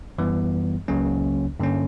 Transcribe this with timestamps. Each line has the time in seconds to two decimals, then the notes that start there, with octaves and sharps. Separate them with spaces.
0.18 F#2 E3 G3 B3
0.88 C#2 C#3 F#3 A#3 C#4
1.60 G2 D3 A#3 C#4